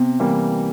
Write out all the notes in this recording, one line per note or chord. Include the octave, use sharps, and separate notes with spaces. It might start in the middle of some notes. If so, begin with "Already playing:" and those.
Already playing: C3 B3
E3 G3 A#3